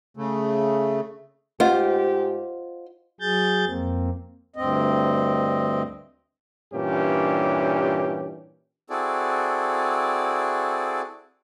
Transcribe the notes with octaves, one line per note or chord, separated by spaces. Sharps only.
C#3 A3
G#2 F4 G4 C5 D#5 F#5
F#3 G#4 G6 A6
F2 A#3 C4
D2 G2 C4 D#5
G2 A#2 E3 C#4 D4 G4
C4 E4 F#4 G#4 A4 D5